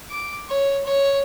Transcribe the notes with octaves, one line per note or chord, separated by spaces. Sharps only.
D6
C#5
C#5